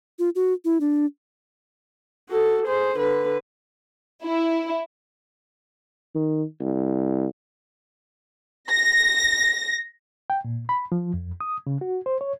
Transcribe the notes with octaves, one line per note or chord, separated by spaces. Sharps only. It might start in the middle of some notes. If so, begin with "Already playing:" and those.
F4
F#4
E4
D4
F#4 A4
G#4 C5
D3 B4
E4
D#3
C2
A#6
G5
A#2
B5
F3
F2
D#6
C#3
F#4
C5
C#5